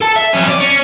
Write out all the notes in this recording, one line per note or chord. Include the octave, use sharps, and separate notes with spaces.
A4 A5
E5
F2 C#4
D5
C#4